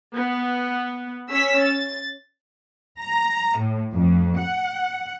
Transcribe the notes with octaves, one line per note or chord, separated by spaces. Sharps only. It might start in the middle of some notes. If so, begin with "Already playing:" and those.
B3
C#4 E6 B6
A6
A#5
A2
F2
F#5